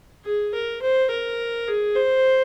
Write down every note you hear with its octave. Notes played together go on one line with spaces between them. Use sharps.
G#4
A#4
C5
A#4
G#4
C5